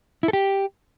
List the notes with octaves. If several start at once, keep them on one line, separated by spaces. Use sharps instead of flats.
E4
A4
G4